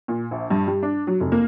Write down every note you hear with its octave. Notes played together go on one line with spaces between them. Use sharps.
A#2
A#1
G2
G3
D4
F#3
F1
A#3